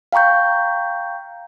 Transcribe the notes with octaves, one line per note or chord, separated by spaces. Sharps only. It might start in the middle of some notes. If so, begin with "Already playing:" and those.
F5 G5 A#5 C#6 G6